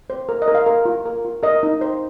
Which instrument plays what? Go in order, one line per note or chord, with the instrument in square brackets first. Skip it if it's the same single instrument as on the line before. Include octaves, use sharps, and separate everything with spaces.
[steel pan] C5
A#4
D#5
A#4
F5
A#4
F4
A#4
F4
A#4 D#5
D#4
C5